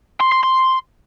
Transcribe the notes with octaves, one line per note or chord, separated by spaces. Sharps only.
C6
C6
C6